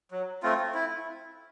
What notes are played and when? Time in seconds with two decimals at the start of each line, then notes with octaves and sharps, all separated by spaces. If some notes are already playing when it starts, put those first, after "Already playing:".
0.11 F#3
0.43 A3 C4 F4
0.75 E4